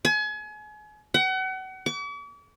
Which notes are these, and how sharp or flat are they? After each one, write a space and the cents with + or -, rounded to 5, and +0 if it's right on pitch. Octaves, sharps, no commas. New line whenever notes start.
G#5 +35
F#5 +35
D6 -45